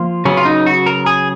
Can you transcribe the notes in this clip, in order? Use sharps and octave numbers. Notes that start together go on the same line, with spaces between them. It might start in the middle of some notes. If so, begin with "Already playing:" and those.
Already playing: F3 A#3 F4
C#3 F#3 B3 C#4
F4
D#4
F#4
A#4
G#4